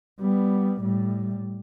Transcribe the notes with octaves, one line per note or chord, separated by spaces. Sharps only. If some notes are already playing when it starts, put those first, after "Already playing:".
G3 B3
A2 G3